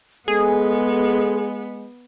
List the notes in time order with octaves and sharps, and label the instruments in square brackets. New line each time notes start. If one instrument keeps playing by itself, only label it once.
[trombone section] G#3 [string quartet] B3 [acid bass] G#4 [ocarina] A4